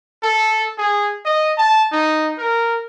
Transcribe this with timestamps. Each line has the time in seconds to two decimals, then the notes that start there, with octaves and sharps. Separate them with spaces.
0.23 A4
0.78 G#4
1.25 D#5
1.57 A5
1.92 D#4
2.38 A#4